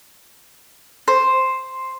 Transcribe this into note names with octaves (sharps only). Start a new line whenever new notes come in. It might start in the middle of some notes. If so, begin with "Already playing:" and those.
C5